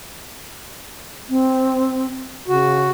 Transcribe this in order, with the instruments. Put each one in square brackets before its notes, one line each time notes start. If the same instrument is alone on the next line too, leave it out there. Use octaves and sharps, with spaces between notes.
[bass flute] C4
[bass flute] C#3 [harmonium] F#4